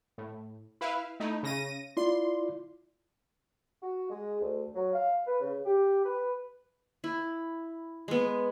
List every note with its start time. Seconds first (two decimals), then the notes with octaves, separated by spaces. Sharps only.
0.18 A2
0.81 E4 B4 F5
1.20 A3 D#4 E4
1.43 C#3 A#6 D#7
1.97 E4 F4 D5 C6
3.81 F#4
4.08 G#3
4.40 D2
4.74 F#3
4.93 F5
5.25 B4
5.39 C#3
5.64 G4
6.03 B4
7.04 E4
8.08 G#3 B3